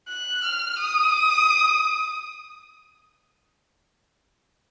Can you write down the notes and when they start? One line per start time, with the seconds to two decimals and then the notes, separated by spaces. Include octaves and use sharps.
0.08 F#6
0.44 F6
0.80 D#6